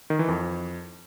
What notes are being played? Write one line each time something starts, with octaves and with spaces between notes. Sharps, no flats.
D#3
E3
F2